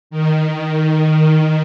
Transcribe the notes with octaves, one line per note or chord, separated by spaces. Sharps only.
D#3